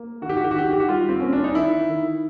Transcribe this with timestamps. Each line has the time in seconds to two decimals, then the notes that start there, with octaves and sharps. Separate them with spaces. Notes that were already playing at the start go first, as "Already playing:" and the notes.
Already playing: A#3
0.22 D#3 F#4
0.29 G4
0.37 F#4
0.44 G4
0.51 F#4
0.56 D#3 G4
0.66 F#4
0.73 G4
0.80 F#4
0.88 G3 F4
1.09 C4
1.20 A#3 C#4
1.33 D4
1.44 D#4
1.55 D#3 E4
1.89 D#3